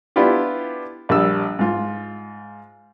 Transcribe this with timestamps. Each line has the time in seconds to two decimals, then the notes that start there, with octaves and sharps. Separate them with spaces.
0.16 B3 D4 E4 F4 G4
1.09 A#1 G3 E6
1.59 G#2 F4